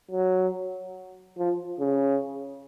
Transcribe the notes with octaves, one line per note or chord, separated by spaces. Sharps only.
F#3
F3
C#3